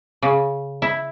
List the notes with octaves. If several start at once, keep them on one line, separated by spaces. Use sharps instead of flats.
C#3
E4